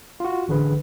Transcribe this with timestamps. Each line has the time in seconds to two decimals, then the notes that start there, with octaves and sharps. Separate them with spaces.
0.20 F4 F#4
0.48 A1 D3 G#4 B4